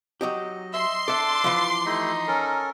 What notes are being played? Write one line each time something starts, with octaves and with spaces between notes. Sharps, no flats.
F#3 D#4 G4 D#5
E5 C6
D4 A4 E5 A5 D6 E6
E3 F3
A3 D#4 E4 G4
C#4 A4 A#4